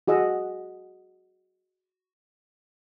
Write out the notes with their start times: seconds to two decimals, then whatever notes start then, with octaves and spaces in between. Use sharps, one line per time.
0.08 F#4 G#4 D#5 F#5 E6